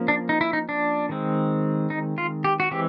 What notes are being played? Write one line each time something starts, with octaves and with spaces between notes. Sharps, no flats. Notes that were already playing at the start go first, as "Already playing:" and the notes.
Already playing: F3 A#3 C#4
D4
D#4
E4
D#4
D4
D#3 G#3 C4
D#4
F4
G4
F#4
E3 G#3 C4 G4